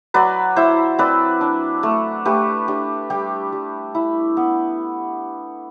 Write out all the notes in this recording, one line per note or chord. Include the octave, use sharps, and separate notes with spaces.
F#3 B4 D5
E4 C5 E5
C4 B4 D5
D4
A3
A3 G4 B4
D4 G4
G3 G4
G3
E4
B3